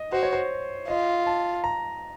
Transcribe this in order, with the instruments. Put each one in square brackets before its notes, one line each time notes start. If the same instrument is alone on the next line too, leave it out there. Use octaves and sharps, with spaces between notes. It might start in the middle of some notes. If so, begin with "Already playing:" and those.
Already playing: [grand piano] D#5
[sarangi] F#4 [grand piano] C5
[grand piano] C#5
C5
[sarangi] F4 [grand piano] D#5
[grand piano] A5
A#5